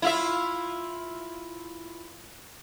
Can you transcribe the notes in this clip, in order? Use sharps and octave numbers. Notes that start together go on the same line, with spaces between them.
E4 F4 E5